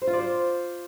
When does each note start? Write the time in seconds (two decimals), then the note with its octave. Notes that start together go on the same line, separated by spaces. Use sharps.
0.02 C5
0.07 F4
0.13 D5
0.19 C5